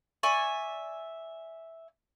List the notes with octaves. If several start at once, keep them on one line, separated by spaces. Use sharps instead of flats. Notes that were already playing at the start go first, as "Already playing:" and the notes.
D5 E5 G#5 C#6